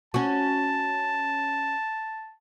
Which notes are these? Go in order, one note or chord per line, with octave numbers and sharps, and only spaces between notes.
C#4 F#4 A5